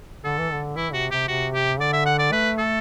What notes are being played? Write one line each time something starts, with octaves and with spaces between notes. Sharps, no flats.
D3 A4
E3
D3
E3 E4
C3 F#4
C3 G4
C3 F#4
G4
D3 D5
E5
F#5
D5
A3 B4
A4